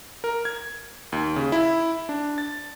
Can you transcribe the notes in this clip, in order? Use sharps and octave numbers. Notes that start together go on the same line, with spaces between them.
A#4
G#6
D#2
C#3
E4
D4
A6